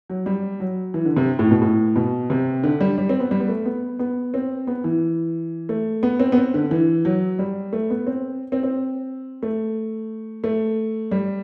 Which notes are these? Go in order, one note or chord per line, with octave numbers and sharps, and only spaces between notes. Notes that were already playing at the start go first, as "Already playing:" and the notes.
F#3
G3
F#3
E3
D3
C3
A2
B2
A2
B2
C3
D3
G3
G3
C4
B3
G3
B3
A3
B3
B3
C4
B3
E3
A3
B3
C4
B3
C4
D3
E3
F#3
G3
A3
B3
C4
C4
C4
A3
A3
G3